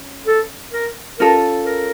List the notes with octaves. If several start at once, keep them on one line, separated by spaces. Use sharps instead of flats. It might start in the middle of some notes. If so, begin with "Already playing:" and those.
Already playing: C#4
A4
A#4
C#4 F4 A4 A#4
A#4